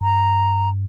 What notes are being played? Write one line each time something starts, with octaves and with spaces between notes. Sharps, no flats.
G2 A#5